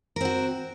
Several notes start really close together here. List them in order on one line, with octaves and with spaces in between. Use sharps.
A#4 C4 F#4